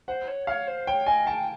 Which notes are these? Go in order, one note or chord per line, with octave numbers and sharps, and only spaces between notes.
C5 F#5
C#5
C#5 F5
C5
C#5 G5
D#5 G#5
G5 A5